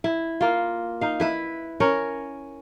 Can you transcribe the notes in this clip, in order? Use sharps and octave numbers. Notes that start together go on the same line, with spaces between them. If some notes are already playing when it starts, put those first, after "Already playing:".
E4
A#3 F4
D#4 F5
E4 B4 E5
C#4 A#4 C#5